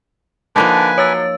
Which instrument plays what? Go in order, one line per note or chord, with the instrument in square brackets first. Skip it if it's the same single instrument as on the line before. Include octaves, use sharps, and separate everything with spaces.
[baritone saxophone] D3 [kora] F3 A#3 D#4 [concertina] B4 G#5
[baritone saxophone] F#3 [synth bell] C#5 E6 A6